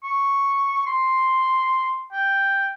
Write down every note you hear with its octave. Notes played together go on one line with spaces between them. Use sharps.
C#6
C6
G5